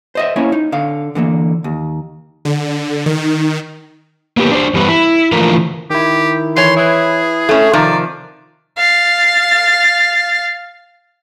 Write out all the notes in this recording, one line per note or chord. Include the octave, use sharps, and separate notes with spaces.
C5 D#5 E5
A#3 C#4 E4 C#5
D#4
D3 F5
D3 E3 F3 A#3
D#2
D3
D#3
A#3 B3 G4
D4 C5
E2 G2 G3 B3 B4
E4
D3 E3 F3 A3 F4 A#4
D#3 E4 G4
E3 C#5 C6
E4 G#4 B4
A3 C#4
C3 D#3 F3 D5
F5 A6